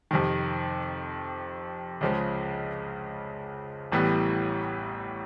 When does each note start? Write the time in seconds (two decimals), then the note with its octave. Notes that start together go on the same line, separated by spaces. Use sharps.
0.11 F2 C3 D#3
2.01 C#2 C#3 F3 G#3
3.92 A1 A2 E3 G3 B3